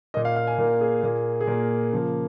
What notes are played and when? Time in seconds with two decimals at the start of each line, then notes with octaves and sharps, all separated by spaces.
0.14 A#2 A#3 D#5
0.25 F5
0.36 F5
0.47 G#5
0.58 A#2 A#4
0.61 A#3
0.81 G#4
1.03 A#2 A#3 G#4
1.41 G#4
1.47 A#2 A#3 A#4
1.93 C#3 F3 A#3